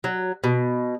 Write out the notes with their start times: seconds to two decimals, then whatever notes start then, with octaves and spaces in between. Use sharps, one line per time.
0.04 F#3
0.44 B2